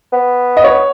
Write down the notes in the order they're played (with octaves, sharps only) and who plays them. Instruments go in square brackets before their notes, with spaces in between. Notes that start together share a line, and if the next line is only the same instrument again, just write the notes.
[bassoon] B3
[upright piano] D#5
C#5